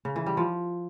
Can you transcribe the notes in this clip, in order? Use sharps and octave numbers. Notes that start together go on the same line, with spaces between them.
C#3
E3
G3
F3